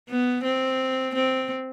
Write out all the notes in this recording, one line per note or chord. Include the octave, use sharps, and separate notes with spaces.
B3
C4
C4